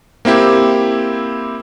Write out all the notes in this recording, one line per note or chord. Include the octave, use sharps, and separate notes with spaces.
A#3 C4 E4 G4